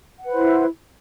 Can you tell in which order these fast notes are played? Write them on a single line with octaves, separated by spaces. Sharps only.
F#5 B4 C5 E4